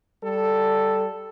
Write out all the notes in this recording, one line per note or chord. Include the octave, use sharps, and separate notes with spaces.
G3 A4